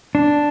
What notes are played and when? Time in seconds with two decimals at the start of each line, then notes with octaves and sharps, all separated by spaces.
0.15 D4